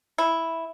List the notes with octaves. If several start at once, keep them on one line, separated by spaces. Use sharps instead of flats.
E4